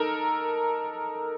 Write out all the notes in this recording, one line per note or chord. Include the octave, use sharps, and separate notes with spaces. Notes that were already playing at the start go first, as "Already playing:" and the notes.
Already playing: D#4 A4 A#4